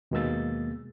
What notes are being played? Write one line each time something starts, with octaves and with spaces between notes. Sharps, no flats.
D#2 B2 G#3 A#3 E6 A6